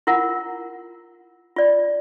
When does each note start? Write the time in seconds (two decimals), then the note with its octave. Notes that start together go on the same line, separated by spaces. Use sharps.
0.07 E4 F4 A#4 F#5
1.56 F4 D5